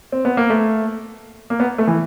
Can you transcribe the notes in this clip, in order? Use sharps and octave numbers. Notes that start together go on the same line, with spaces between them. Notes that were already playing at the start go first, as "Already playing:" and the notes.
C4
B3
A#3
A3
A#3
B3
A3
E3